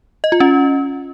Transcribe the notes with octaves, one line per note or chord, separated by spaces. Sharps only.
D#5
F4
C#4